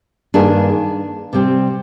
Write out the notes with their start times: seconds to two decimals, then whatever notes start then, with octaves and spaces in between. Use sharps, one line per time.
0.34 G2 D#3 A#3 D4 G#4
1.33 C3 G3 C4